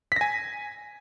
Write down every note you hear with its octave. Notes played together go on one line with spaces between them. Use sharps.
G#5 A#6 B6